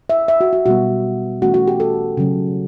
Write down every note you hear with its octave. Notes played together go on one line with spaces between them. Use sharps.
E5
E5
F#4
F#4
B2 G3 B3 F#4
E3 A3 C#4 F#4
F#4
G4
A4
C#3 F#3 C#4